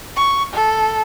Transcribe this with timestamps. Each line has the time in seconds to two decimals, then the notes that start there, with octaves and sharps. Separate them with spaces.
0.16 C#6
0.53 A4